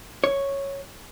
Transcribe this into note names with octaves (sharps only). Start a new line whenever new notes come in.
C#5